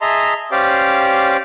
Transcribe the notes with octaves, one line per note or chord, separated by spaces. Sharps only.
G#4 D#5 E5 A5 A#5 C6
C#4 G4 C5 D5 F5